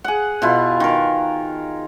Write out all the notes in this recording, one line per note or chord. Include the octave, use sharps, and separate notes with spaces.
G#4 F#5
B2 E4 F4
D#3 A#4